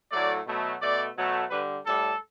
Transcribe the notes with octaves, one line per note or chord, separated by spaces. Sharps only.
A2 F#3 A3 D5
B2 F#3 A3
B2 A3 D5
B2 F#3 A3
D3 G3 B4
A2 G3 A4